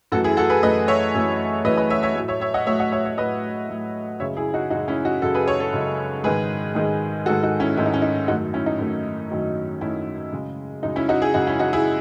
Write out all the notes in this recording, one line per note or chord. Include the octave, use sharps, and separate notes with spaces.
F#2 E3 A3 F#4 A4
E4 G#4
F#4 A4
G#4 B4
F#2 E3 A3 B4 D#5
C#5 E5
F#2 E3 A3
F#2 E3 A3 B4 D#5
B4 D#5
C#5 E5
C#5 E5
A2 F#3 A3
C#5 E5
C#5 E5
D#5 F#5
A2 F#3 A3 C#5 E5
D#5 F#5
C#5 E5
C#5 E5
A2 F#3 A3 B4 D#5
A2 F#3 A3
F#2 C#3 G#3 C#5 E5
E4 G#4
D#4 F#4
F#2 C#3 G#3 D#4 F#4
C#4 E4
D#4 F#4
F#2 C#3 G#3 F#4 A4
G#4 B4
A4 C#5
A4 C#5
F#2 C#3 G#3
G#2 D#3 G#3 G#4 B4
G#2 D#3 G#3
G#2 D#3 G#3 F#4 A4
D#4 F#4
C#4 E4
G#2 D#3 G#3 E4
D#4
C#4
D#4
F#2 D#3 F#3 A3 D#4 F#4
C#4 E4
D#4
F#2 D#3 F#3 A3
F#2 D#3 F#3 A3
F#2 D#3 F#3 A3 C#4 E4
F#2 C#3 G#3
F#2 C#3 G#3 D#4
C#4 E4
D#4 F#4
E4 G#4
F#2 C#3 G#3 D#4 F#4
C#4 E4
D#4 F#4
E4 G#4